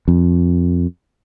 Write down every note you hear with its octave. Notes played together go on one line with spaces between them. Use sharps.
F2